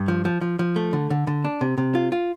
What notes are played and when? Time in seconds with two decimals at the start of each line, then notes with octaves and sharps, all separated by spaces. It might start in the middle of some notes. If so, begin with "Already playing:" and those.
Already playing: G2
0.08 F3
0.25 F3
0.41 F3
0.59 F3
0.76 A3
0.93 D3
1.10 D3
1.27 D3
1.45 D4
1.61 C3
1.78 C3
1.95 F4
2.12 F4